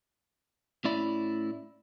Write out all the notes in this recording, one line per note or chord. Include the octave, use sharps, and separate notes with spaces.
A2 C#4 E4 D5 B5